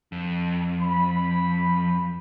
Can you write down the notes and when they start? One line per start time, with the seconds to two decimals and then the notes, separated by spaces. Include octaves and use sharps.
0.12 F2
0.81 B5